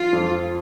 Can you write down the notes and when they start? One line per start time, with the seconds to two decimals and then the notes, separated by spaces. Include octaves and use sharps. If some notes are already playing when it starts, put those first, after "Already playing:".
Already playing: F3 F4
0.13 F2